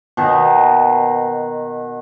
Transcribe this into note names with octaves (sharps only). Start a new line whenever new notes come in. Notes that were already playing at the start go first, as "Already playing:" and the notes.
B2 D#3